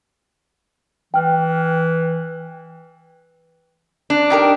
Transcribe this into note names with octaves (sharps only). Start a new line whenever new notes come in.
E3 G5 F6
D4
D#4 G4 A#4